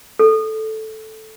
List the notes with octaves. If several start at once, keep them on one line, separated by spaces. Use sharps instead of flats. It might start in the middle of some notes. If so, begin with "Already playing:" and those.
A4